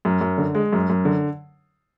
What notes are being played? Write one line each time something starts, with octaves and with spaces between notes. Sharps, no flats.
F#2
F#2
D3
G#3
F#2
F#2
D3